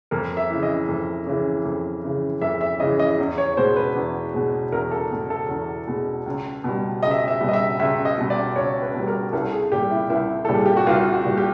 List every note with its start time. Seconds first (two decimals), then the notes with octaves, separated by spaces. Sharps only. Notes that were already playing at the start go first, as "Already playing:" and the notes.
0.11 F2 A#4
0.37 E5
0.50 C#3 E3
0.63 D#5
0.89 F2
1.26 C#3 E3
1.65 F2
2.04 C#3 E3
2.42 F2 E5
2.61 E5
2.80 C#3 E3 D#5
2.99 D#5
3.19 E2
3.38 C#5
3.57 B2 G#3 C5
3.76 B4
3.95 E2
4.34 B2 G#3
4.72 E2 A#4
4.91 A4
5.11 B2 G#3 G#4
5.30 A4
5.49 E2
5.87 B2 G#3
6.26 C#2
6.64 B2 G3
7.03 C#2 D#5
7.11 E5
7.18 D#5
7.28 E5
7.41 B2 G3
7.48 D#5
7.53 E5
7.79 C#2 E5
8.05 D#5
8.18 B2 G3
8.30 D5
8.56 C#2 C#5
8.82 B4
8.94 B2 G3
9.08 A#4
9.33 C2 A4
9.52 G#4
9.72 A#2 G3 G4
9.90 E4
10.10 C2 E4
10.45 A#2 G3 A4
10.55 G#4
10.66 G4
10.77 F#4
10.87 C2 F4
11.12 F#4
11.25 A#2 G3
11.37 G4